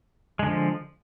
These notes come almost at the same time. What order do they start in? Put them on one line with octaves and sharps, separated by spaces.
G#3 D3 F3